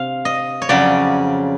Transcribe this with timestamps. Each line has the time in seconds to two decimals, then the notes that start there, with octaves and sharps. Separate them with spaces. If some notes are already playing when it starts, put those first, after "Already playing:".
Already playing: C3 F5
0.25 D#5
0.62 C#5
0.69 F2 C#3 F#3 D5